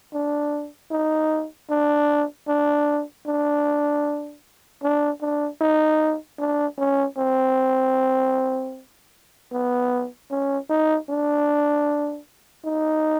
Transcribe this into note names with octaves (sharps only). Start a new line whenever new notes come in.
D4
D#4
D4
D4
D4
D4
D4
D#4
D4
C#4
C4
B3
C#4
D#4
D4
D#4